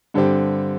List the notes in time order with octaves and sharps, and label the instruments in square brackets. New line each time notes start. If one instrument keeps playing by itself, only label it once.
[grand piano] G2 D3 G3 C4 G4